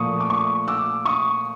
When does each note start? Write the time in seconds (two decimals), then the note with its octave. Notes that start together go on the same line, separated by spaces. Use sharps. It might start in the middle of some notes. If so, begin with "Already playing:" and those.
Already playing: A#2 F3 A3 C#6 D#6
0.20 D6
0.30 C#6 D#6
0.68 D6 E6
1.05 C#6 D#6